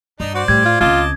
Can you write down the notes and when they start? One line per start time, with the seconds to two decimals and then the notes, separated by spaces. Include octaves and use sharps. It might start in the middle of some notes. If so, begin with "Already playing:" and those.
0.20 G2 D4 D#4
0.35 F#4 C5 D5
0.48 A2 G3 G#6
0.65 F4
0.81 C#2 C4 F4 D#5 A5 D6